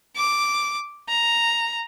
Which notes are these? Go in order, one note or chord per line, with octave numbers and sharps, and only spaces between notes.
D6
A#5